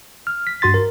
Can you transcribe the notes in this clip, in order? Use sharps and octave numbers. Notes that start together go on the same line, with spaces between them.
F6
B6
G2 F#4 C6 A6
A#4